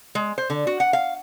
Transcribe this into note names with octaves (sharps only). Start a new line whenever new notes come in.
G#3
C5
D3
F#4
F#5
F5